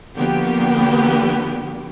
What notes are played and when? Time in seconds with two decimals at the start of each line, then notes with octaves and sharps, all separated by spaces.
0.16 D3 F3 A#3 B3 F#4 G4